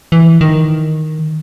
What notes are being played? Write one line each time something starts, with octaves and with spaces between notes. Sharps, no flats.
E3
D#3